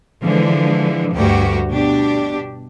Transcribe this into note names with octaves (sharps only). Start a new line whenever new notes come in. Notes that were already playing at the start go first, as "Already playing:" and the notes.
D3 E3 F3 G#3
D2 G2 F#4 G4
B2 D4 G4